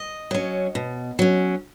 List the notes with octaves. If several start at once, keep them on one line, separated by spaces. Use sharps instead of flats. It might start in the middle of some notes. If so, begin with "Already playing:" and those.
Already playing: D#5
F#3 C#4
B2
F#3 C#4